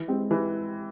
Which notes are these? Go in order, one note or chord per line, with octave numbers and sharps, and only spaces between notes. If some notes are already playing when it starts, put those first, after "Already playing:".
Already playing: E3
G#3 C4
E3